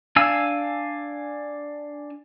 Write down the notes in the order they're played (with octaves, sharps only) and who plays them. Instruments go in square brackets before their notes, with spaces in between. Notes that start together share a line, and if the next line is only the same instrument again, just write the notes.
[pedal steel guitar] D4 F5 G#5 E6